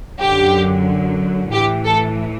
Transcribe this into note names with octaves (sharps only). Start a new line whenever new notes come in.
F#2 D3 F#3 G4
A2 E3 G4
A4